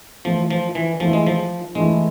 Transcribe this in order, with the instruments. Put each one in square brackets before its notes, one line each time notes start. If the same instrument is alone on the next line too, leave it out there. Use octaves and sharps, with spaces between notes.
[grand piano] E3 A3 E4 [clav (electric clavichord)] F3
[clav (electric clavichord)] F3
E3
[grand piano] E3 A3 E4 [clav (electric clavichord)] F3
[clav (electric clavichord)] G#3
F3
[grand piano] E3 A3 E4 [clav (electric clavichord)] G#3